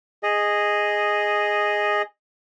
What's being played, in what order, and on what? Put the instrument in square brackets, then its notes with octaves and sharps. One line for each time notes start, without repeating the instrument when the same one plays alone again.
[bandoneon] G#4 D#5